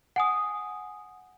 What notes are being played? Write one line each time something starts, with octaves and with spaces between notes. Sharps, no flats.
F#5 G#5 D#6